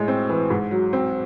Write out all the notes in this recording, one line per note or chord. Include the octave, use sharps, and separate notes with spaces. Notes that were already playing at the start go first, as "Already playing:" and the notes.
Already playing: A2 G#3
C4
E3
G#2
F#3
C4